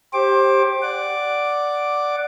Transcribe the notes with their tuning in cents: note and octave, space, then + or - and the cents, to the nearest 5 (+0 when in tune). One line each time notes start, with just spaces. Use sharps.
G4 +0 C5 +25 D6 +0
D5 +0 F#5 +0 D6 +0